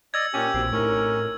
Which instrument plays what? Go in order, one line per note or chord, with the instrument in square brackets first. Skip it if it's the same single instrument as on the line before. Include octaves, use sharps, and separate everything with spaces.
[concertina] D5 D#5 [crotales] E6 G#6
[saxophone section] A#2 C#4 [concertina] G4
[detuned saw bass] A#1 [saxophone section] D#2 B2 C4
[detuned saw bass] A2 [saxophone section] C3 D#4 A#4 [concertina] C#4